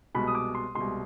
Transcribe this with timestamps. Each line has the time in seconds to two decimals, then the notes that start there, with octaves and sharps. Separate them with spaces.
0.15 C2 B2 G#3 B5
0.28 D#6
0.35 D6
0.55 C6
0.75 C2 B2 G#3 C6